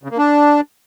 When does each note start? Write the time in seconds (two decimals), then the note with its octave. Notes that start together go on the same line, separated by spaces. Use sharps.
0.03 C#3
0.11 A#3
0.18 D4